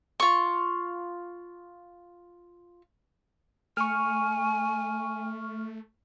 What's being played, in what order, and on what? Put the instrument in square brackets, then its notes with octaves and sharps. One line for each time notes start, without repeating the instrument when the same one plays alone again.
[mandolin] F4 C#6
[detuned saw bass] A3 [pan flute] G#5 [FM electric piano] C#6 F6